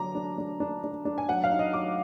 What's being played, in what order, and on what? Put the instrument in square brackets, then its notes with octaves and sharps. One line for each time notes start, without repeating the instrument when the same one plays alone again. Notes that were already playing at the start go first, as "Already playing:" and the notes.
Already playing: [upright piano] D3 F#3 D4 A#5 D6
D4
D4
D4
D4
D4
G#5
F#3 F#5
F5
D#4
D#5
F#3 D6